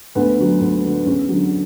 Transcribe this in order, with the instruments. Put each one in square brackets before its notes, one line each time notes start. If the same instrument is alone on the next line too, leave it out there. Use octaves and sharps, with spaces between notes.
[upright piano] D2 B3
D3 F#3
D2
D3 F#3
E2 C#4
D3 F#3